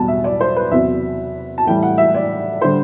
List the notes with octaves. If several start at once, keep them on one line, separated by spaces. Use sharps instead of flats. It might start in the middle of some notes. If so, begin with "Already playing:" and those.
Already playing: E2 B2 G3 A5
E5
D5
C5
B4
E2 C3 F#3 E5
A5
A2 E3 G3 G5
F#5
E5
D5
D3 G3 C5